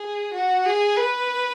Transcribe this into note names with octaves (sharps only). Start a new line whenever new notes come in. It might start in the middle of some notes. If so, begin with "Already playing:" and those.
Already playing: G#4
F#4
G#4
B4